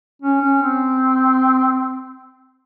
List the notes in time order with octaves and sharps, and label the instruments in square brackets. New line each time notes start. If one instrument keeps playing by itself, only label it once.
[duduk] C#4
C#4
C4